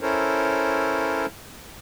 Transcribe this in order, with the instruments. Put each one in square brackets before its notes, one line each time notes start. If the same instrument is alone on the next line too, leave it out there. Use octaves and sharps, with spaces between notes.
[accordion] C#4 E4 A4 A#4 C5 C#5